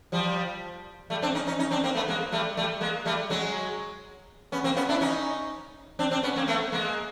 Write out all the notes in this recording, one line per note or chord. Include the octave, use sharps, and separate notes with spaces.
F3 G3
G3 A3
C4 D4
C#4 D#4
C#4 D#4
C#4 D#4
C4 D4
A#3 C4
A3 B3
G#3 A#3
G3 A3
G3 A3
G#3 A#3
G3 A3
F#3 G#3
B3 C#4
A#3 C4
B3 C#4
D4 E4
C#4 D#4
C4 D4
C4 D4
B3 C#4
A#3 C4
A3 B3
G#3 A#3